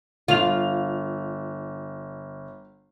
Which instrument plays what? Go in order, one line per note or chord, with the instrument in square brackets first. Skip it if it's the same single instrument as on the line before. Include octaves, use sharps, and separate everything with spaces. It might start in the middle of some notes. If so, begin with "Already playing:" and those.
[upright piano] G1 F7 [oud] F4